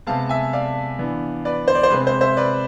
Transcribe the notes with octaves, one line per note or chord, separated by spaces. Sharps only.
C3 G#3 B3 F5 A5
E5 G#5
D5 F5
E3 B3 D4
B4 D5
C5
D5
C5
C3 G#3 C4 B4
C5
C5 E5
B4 D5